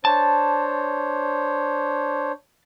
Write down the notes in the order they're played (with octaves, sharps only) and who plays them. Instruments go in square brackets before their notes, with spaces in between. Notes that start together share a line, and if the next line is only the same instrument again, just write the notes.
[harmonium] D4 C5 C#5 [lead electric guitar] A5